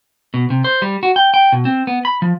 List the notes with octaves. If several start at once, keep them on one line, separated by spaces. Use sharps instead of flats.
B2
C3
C5
G3
F#4
G5
G5
B2
C4
B3
B5
F3